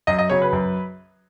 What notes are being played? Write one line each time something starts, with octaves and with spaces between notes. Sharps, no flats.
F#2 D#5
D#5
C#3 F#3 C#5
B4
F#2